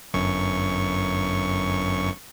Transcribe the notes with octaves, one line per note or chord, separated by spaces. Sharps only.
G1 F#2 C#6